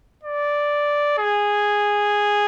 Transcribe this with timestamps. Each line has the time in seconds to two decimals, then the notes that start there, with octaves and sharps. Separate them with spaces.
0.23 D5
1.18 G#4